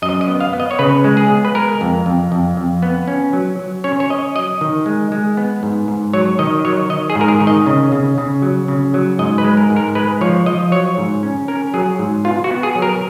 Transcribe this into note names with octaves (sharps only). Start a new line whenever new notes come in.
F#2 D#5
D#5
B3
F5
B3
D#5
C#5
C#3 B4
G#3
G#4
B3
B4
G#3 A#4
F2
F2
F2
F2
B3
C#4
F#3
F#3
C#4 C#5
C#5
C#4 D#5
F#3 D#5
D#3
G#3
G#3
B3
G#2
G#2
F#3 C#5
D#3 D#5
F#3 C#5
D#3 D#5
G#4
G#2
A#4
G#4
D#3
D#5
C#3
C#3
C#3
F#3
C#3
F#3
G#2 D#5
B4
G#3
A#4
G#2
A#4
G#3 B4
F3 C#5
F3 D#5
F#3 C#5
G#2
C#4
C#4 A#4
F#3 G#4
G#2
B3 F4
F#4
B3
G#4
F#3
A#4